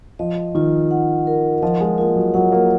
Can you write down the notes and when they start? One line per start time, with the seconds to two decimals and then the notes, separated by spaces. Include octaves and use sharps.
0.19 F3 D#5
0.55 D#3 F4
0.91 F#5
1.27 A#4
1.62 F3 D#5
1.80 G#3
1.98 A#3 F4
2.16 F#3
2.34 F#3 F#5
2.52 A#3